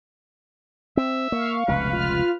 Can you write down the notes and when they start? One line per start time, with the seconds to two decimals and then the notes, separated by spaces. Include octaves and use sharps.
0.97 C4 E5
1.32 A#3 F5 C#6
1.68 F1 C#2 B2 B4
1.93 F4 F6